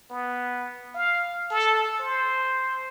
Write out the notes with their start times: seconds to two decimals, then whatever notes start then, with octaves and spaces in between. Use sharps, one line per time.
0.10 B3
0.95 F5
1.51 A4
2.00 C5